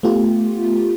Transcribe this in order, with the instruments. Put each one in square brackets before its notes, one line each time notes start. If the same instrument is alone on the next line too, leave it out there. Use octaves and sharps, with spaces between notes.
[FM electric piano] A3 B3 F4 G4